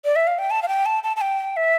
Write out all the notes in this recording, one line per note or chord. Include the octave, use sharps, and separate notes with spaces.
D5
E5
F5
G5
A5
F5
G5
A5
A5
A5
G5
E5